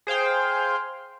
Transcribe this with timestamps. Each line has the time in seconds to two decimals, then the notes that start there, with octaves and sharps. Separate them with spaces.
0.07 G#4 C5 F5 G5